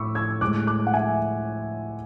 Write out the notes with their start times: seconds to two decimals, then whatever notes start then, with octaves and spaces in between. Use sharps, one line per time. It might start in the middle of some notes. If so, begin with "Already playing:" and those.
Already playing: A2 B5 C#6 D6 E6
0.15 E6 G#6
0.41 A2 G#3 D6 F#6
0.67 D6 F#6
0.87 F#5
0.94 E5 G#5